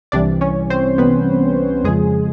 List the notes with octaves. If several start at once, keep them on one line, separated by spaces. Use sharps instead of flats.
C2 C3 E3 G3 D4 D5
C#4 C#5
C4 C5
C2 C3 E3 G3 B3 B4
F2 C#3 F3 G#3 G#4